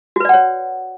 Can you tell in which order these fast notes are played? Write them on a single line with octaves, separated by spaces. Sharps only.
F#4 B4 D5 F#5 C#5